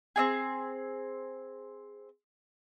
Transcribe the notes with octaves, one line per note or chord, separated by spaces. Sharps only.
C4 D#4 G#4